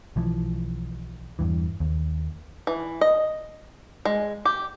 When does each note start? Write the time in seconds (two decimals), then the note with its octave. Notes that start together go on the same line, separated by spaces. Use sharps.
0.16 B1 E3 F3
1.39 E2 G2 E3
1.80 D#2
2.67 E3
3.01 D#5
4.05 G#3
4.45 G4